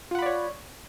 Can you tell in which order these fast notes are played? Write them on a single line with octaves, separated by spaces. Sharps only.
F4 F#5 B5 D5 C#5